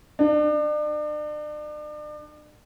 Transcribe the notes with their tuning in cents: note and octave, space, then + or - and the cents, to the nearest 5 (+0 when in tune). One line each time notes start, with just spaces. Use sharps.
D4 +40